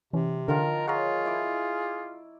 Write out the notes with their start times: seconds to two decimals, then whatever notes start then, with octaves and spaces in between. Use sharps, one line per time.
0.13 C3 E3 C#4
0.48 D3 D#3 F3 F4 A#4
0.88 F4 G#4 C#5 F#5 A#5
1.25 E4 D5